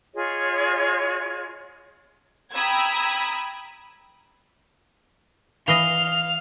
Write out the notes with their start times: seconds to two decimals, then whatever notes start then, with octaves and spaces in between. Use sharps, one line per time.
0.15 F4 G#4 C#5 D#5
2.54 G5 A#5 B5 D#6 E6 G#6
5.68 E3 D#5 F5 D#6 C7 F7 G7